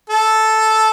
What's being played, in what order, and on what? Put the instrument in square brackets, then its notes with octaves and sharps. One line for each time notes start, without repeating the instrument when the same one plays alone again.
[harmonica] A4